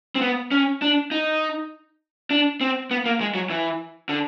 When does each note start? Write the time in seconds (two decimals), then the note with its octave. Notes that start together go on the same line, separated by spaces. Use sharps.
0.15 C4
0.21 B3
0.51 C#4
0.82 D4
1.11 D#4
2.30 D4
2.61 C4
2.91 B3
3.06 A#3
3.21 G#3
3.34 F#3
3.50 E3
4.09 D3